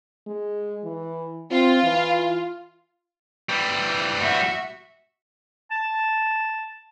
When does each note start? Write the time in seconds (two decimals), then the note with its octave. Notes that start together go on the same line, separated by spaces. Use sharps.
0.27 G#3
0.84 E3
1.51 C4 F4
1.83 E3
3.49 E3 G3
4.18 F#4 E5
5.71 A5